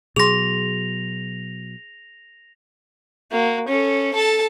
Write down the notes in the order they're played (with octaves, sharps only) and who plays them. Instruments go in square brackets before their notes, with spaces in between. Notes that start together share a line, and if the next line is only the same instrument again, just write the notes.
[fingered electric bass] B2 F#3 [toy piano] G#4 C6 [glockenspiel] A#6 F7
[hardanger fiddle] A#3 F#4
C#4 A4
A4 A5